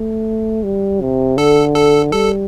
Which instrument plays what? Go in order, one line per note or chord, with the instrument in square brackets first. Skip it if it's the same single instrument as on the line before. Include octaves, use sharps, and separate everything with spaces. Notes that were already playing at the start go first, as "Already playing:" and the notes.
Already playing: [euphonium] A3
G3
C3
[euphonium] D3 [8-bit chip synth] A4
[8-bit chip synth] A4
[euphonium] G3 [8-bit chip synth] A4